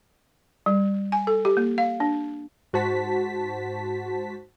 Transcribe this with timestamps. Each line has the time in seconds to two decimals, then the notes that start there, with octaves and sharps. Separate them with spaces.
0.66 G3
1.12 G#5
1.27 A4
1.45 G4
1.57 A#3
1.78 F5
2.00 D4
2.73 G#2 F#4 C5 A5 B6